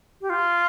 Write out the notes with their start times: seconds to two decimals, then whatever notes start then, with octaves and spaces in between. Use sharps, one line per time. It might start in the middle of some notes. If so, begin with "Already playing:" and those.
0.21 G4
0.30 F4